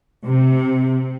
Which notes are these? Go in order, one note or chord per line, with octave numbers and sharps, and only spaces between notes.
C3